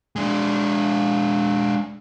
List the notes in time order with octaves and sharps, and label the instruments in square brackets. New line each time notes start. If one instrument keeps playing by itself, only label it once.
[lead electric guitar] G#3 D4